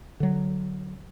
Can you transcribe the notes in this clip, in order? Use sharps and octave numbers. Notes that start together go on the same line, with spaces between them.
D3 F#3